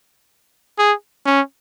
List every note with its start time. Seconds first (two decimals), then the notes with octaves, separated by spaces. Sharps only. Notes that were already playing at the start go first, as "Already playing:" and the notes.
0.79 G#4
1.26 C#4